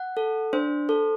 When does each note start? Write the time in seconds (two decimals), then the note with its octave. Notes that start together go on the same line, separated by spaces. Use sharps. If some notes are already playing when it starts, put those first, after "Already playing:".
Already playing: F#5
0.17 A4
0.53 D4 C5
0.89 A4